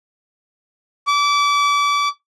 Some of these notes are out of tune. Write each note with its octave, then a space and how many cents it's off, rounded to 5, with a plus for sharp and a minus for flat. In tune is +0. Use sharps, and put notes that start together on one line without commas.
D6 -30